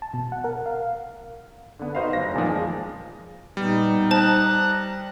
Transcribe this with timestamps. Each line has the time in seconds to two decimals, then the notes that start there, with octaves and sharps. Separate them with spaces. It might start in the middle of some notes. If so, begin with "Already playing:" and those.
0.02 A5
0.14 B2
0.32 F#5
0.44 A#4
0.66 F5
1.79 D3 B3
1.95 D#4 F#4 B4 C5 D#5 F5
2.13 F#1 A#6
2.34 E2 A#2 D#3 F3
2.49 G#3
3.57 A#2 G3 B3 D#4
4.11 C5 A5 A#5 F#6